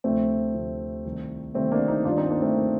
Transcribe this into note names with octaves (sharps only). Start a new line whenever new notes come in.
D2 C3 F3 A3 C4
D2 C3 F3
C2 C3 D#3
C2 C3 D#3 A3 C4
A#3 D4
C4 D#4
G2 D#3 D4 F4
C4 D#4
A#3 D4
A3 C4
D#3 A#3